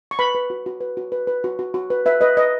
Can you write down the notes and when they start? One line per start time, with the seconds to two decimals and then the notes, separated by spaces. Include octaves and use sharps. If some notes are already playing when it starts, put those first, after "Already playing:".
0.11 C#6
0.19 B4 B5
0.35 B4
0.50 F#4
0.66 F#4
0.81 B4
0.97 F#4
1.12 B4
1.27 B4
1.44 F#4
1.59 F#4
1.74 F#4
1.90 B4
2.06 B4 E5
2.21 B4 D#5
2.37 B4 D#5